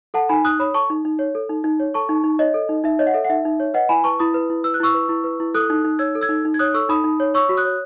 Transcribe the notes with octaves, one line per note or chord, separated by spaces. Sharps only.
A4 F#5 A5
D#4 G#5 B5
D#4 D#6 F#6
C#5 B5 D#6
A4 A5 C#6
D#4
D#4
C#5
A4
D#4
D#4
C#5
A4 A5 C#6
D#4
D#4
C#5 D#5
A4
D#4
D#4 E5
C#5 D#5
F#5
A4 E5
F#5
D#4 E5
D#4
C#5
B4 D#5 F#5
E4 G#5 B5
B4 A5 C#6
E4 B5 D#6
B4
E4
B4 E6
F#6
E4 C#6 E6
B4
E4
B4
E4
A4 D#6 F#6
D#4
D#4
C#5 E6 G#6
A4
E6 G#6
D#4
D#4
G#6
C#5 D#6 F#6
A4 C#6 E6
D#4 B5 D#6
D#4
C#5
C#5 C#6 E6
F#4
D#6 F#6
C#5